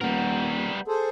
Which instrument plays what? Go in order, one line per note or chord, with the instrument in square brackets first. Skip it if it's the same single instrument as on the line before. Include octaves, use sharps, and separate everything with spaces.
[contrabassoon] D#1 [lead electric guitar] G3 A#4 [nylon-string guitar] B3
[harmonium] G#4 A4 C5